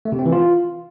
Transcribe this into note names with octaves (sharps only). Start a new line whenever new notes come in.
A3
C3
C4
E3
F4